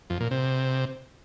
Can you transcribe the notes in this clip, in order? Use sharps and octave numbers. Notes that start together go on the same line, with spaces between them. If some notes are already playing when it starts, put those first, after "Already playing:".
F2
A#2
C3